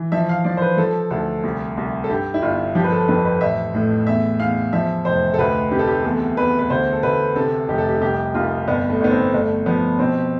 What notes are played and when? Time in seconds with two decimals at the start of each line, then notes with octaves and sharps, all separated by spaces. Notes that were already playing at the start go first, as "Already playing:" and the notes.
Already playing: E3
0.12 F3 E5
0.29 F5
0.44 F3 D5
0.57 C5
0.62 B4
0.77 F3 A4
1.11 D2 A4
1.43 C2
1.77 C2
2.04 A4
2.10 G2 G4
2.34 E4
2.42 G1 F4
2.75 F3 G4
2.84 B4
2.92 A4
3.08 F2 B4
3.25 B4
3.41 A1 E5
3.74 A2
4.07 E2 E5
4.40 E2 F5
4.73 F3 E5
5.05 F1 C5
5.34 A4
5.38 D2 B4
5.71 C3 G4
5.79 A4
5.87 G4
6.04 E2 A4
6.37 E2 B4
6.59 B4
6.70 D2 C5
6.93 A4
7.03 D2 B4
7.36 C3 A4
7.68 F1 G4
7.78 A4
7.89 G4
8.01 C2 G4
8.35 C2 F4
8.68 G1 B3
8.89 A3
9.01 G1 B3
9.11 C4
9.34 G1 A3
9.66 F3 B3
9.99 B2 C4